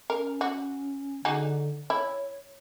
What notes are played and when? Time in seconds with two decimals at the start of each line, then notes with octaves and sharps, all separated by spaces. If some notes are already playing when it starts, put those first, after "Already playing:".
0.10 C#4 A#4
0.41 F#4
1.25 D3 D#4 F#4 G#4
1.90 E4 C#5